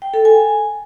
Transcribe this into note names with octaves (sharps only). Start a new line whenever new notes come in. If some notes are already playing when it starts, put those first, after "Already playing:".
G5
A4
G#5